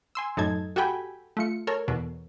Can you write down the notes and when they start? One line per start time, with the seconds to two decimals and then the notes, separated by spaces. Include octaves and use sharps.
0.15 G#5 C6 E6
0.37 F#2 A2 D#4 A4 A5 G#6
0.76 F#4 G4 A4 G5 G#5 B5
1.37 A3 F4 C#7
1.67 A4 A#4 C#5
1.88 E2 B2